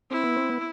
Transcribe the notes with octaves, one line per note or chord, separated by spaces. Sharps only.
C4 E4
B3
C4
B3